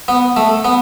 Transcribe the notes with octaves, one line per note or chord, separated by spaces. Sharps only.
B3
A3
B3